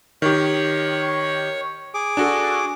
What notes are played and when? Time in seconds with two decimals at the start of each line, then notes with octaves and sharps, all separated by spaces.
0.22 D#3 G4 C#5
1.94 G#4 D6
2.17 D4 F#4 A4